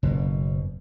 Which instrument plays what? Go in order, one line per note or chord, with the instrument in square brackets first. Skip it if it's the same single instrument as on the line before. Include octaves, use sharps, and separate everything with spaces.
[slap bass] F#1 B2